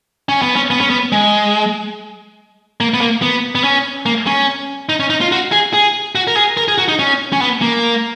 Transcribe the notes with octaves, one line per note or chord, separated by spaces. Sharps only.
C#4
B3
C#4
B3
C#4
B3
G#3
A#3
B3
A#3
B3
B3
C#4
A#3
C#4
D#4
C#4
D#4
F4
F#4
G#4
G#4
F#4
A#4
G#4
A#4
G#4
F#4
D#4
C#4
C#4
B3
A#3